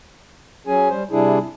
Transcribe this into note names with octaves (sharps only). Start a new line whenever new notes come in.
F#3 C#4 G#4 G#5
G3 C5
C3 G3 D4 E4 G#4